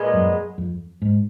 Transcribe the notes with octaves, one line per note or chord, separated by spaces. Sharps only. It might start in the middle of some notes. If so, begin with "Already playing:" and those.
Already playing: A#2 G#3 B3
F#2
F2
G#2